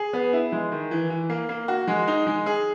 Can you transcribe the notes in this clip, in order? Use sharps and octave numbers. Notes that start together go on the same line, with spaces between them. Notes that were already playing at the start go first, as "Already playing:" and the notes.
Already playing: G#4
B3
E4
G#3
D#3
E3
E3
A#3
A#3
F#4
G#3
D#4
G#3
G#4